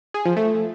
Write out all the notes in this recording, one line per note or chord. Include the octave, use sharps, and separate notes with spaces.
G#4
F3
A3